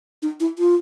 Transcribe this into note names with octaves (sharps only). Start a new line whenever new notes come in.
D#4
E4
F4